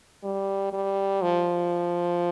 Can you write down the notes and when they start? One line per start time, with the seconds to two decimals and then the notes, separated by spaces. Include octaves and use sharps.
0.23 G3
0.73 G3
1.22 F3